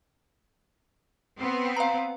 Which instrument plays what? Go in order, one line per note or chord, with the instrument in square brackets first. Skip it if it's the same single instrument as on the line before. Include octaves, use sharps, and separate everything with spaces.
[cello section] B3 C4
[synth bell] F5 A#5